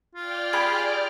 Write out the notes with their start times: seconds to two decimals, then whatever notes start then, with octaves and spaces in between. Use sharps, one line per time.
0.15 F4 D5 G5 F6
0.53 G4 G#4 B5